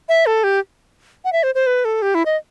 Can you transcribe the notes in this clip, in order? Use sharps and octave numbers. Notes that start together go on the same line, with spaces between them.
E5
A4
G4
F#5
E5
C5
C5
B4
A4
G4
E4
D#5